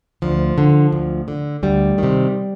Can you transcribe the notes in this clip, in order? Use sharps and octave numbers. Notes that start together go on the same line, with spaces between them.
D2 F3
D3
D2
D3
D2 G3
C3 D#3